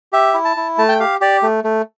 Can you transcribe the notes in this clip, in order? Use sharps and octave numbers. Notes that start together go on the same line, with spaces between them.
G4 E5
E4
A5
E4
A3 A5
G5
G4 F5
G4 D5
A3
A3